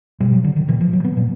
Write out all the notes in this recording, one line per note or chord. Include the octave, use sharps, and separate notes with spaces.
B2 G3
F#3
D3
D#3
A#2 E3
F3
F#3
B3
A#2